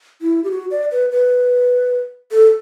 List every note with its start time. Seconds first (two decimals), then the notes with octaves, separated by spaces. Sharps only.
0.22 E4
0.44 G4
0.51 F#4
0.71 D5
0.92 B4
1.12 B4
2.31 A4